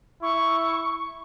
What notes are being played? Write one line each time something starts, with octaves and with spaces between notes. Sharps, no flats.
E4 C#6